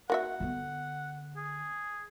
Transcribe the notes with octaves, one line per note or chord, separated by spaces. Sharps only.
A#3 F#4 E5 F#5
D3 B3
G#4